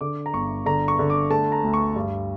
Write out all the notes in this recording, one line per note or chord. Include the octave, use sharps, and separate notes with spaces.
D3 D6
A#5
G1 C#6
D3 A#5
C#6
D3
D6
A3 A5
A#5
D2
C#6
G2